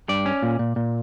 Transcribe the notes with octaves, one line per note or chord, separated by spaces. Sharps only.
G2 D5
C#4
A#2
A#2
A#2